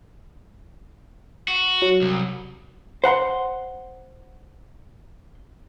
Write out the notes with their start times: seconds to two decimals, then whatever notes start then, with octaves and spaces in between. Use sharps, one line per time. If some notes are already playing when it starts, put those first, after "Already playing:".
1.48 F#4
1.82 F#3
2.02 C2
3.04 C5 F#5 A#5 C6